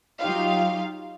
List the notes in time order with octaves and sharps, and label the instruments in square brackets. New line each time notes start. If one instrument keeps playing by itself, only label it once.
[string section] F#3 D#4 F4 G4 F5